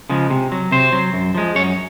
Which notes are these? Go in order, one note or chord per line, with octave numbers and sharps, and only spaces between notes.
C#3 F3 G#3
C3
F#3
C3 C5
F#3
F#2
F3 G#3
F#2 C#5